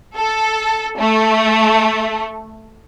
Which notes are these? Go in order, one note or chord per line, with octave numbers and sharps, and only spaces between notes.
A4
A3